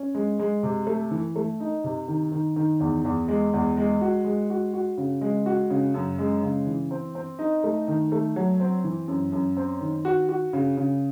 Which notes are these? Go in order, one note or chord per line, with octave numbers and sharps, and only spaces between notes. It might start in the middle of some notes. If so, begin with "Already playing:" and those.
Already playing: C#4
G#3
G#3
C3
A3
E3
A3
D#4
C3
D#3
D#3
D#3
E2
E2
G#3
E2
G#3
F#4
G#3
F#4
F#4
C#3
G#3
F#4
C#3
F#2
G#3
C#3
E3
C4
C4
D#4
A3
D#3
A3
F#3
C4
E3
F#2
F#2
C4
D#3
F#4
F#4
C#3
C#3